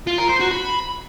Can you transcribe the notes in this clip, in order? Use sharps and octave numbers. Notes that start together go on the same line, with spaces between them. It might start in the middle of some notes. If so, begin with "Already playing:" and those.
F4
A#4
C5
F#4
B5